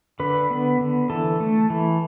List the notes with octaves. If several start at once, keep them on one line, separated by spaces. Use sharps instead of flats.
D3 B4
B3
D3
E3 A4
A3
E3